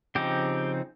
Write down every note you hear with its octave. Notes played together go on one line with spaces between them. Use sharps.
C#3 F3 C4 D#4 G4